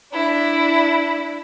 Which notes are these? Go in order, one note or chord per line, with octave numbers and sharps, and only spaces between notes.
D4 E4